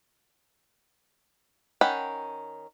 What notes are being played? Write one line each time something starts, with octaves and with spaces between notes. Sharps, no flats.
D#3 C#4 F#5 G5 B5